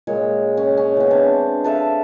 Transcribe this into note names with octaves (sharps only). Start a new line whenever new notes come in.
A#2 G#3 C#5
C#4
C#4
E3 B3
C4 D4
A4 B4 E5 F5